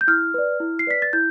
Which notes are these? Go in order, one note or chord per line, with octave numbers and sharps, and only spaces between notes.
G6
E4 F6
B4 D5
E4
C7
B4 D5 B6
A6
E4 G6